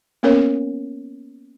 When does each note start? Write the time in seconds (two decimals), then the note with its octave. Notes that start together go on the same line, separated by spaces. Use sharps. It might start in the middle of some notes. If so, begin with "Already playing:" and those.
0.23 A#3 B3 C#4 A#4 C#5